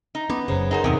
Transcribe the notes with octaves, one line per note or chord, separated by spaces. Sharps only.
D#4
B3 C#4 D6
F#1 F#2 C#3 C5 A#5
D#4 G#4 A#4 C5 C#5 F#5
E2 A2 C3 B3 D#4 A#4